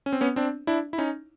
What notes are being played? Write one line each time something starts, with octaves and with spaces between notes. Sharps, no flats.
C#4
C4
B3 C#4
C4 D4
D4 E4
E4
C#4 D#4